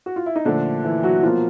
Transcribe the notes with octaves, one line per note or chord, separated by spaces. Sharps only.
F#4
F4
E4
D#4
A#2 D3 F3 A3 D4
E3 E4
F#3 F#4
B2 F3 F#3 A#3 F4